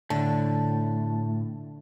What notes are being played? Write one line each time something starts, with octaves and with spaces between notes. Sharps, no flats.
A2 D3 A5